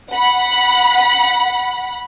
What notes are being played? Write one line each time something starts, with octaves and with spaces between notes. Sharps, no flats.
F#5 B5